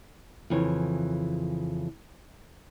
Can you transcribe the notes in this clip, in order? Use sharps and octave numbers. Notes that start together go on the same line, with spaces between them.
F2 C#3 E3 C#5